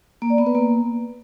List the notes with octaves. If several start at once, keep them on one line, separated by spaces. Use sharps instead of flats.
A#3
D5
B3
B4
A#3